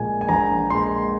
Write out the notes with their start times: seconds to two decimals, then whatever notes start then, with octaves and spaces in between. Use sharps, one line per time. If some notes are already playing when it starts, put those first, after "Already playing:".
Already playing: A#1 A#2 G#3 G#5
0.21 G#5
0.29 A#1 A#5
0.70 A#2 G#3 C6